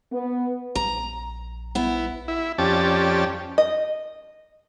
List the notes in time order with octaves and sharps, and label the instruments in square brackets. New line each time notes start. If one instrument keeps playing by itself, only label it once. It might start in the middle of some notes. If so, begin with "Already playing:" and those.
[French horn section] B3
[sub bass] A#1 [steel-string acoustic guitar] A#5
[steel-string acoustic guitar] B3 E4
[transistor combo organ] E4
F2 C#4 G4 D5 A5
[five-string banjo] D#5